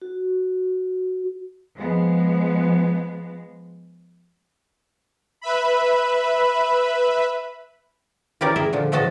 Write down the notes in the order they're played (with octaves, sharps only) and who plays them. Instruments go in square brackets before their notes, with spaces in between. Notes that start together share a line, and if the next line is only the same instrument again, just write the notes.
[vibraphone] F#4
[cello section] F3 G#3 B3
[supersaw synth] B4 E5 B5
[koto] E3 C#4 E4 G4 A#4 D5
G#4 A#4 D#5 E5
A#2 D3 F3
A2 E3 F3 F#4 D#5 A5